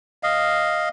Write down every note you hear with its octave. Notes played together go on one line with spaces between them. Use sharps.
D#5 F5